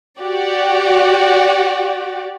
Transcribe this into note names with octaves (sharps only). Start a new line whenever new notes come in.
F#4 G4 D5